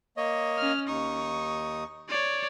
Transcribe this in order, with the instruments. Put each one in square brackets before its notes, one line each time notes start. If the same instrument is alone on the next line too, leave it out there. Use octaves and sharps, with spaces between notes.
[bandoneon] A#3 C#5 D#5
[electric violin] C#4 F6
[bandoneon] D#2 D#4 D#6 [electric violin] C#6
[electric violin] C#5 D5